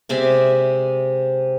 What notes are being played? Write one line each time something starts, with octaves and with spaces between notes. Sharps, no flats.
C3 G#3 D5 E5